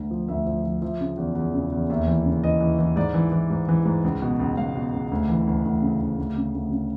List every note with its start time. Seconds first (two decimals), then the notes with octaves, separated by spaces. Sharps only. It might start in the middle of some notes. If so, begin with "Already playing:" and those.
Already playing: D2 D3
0.11 F3
0.28 D2 E5
0.47 F3
0.64 F3
0.82 F3 E5
1.01 C#3
1.17 E2
1.35 E2
1.54 C#3
1.72 E2
1.90 D#2 E5
2.07 E3
2.25 C#3
2.43 E3 D#5
2.60 E3
2.79 E3
2.96 G#2 D5
3.14 E3
3.32 E3
3.50 G#2
3.68 E3
3.85 G#2
4.04 C#2
4.22 B2
4.40 C#2
4.57 C#2 F5
4.75 B2
4.93 C#2
5.12 D2
5.29 E3
5.47 D2
5.65 D2
5.82 C#3
6.00 D2
6.18 D2
6.37 C#3
6.55 D2
6.71 C#3